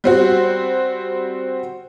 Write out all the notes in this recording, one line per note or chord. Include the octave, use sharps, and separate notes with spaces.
G3 C4 F#4